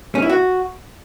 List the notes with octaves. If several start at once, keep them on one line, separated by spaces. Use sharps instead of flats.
C#4
E4
F#4